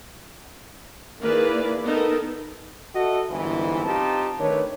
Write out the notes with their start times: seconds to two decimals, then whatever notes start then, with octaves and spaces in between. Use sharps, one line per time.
1.20 D#3 A#3 E4 G#4 B4 D5
1.84 B3 D#4 A4 A#4
2.95 F#4 A4 D#5 E5 F#5
3.31 G1 C2 G#2 E3
3.85 C4 D#4 F4 G4 A5
4.39 D#3 A3 D4 B4 C#5